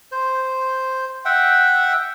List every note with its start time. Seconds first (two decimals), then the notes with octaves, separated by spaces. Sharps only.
0.12 C5
1.25 E5 F#5 G5